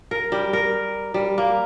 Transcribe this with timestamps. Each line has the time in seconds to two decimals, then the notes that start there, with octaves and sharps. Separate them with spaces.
0.11 A#4
0.32 G3
0.53 A#4
1.14 G3
1.38 A#3